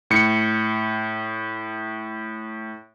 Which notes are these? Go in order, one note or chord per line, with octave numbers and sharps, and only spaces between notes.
A2 C#7